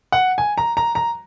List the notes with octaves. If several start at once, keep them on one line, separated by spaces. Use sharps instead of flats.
F#5
G#5
A#5
A#5
A#5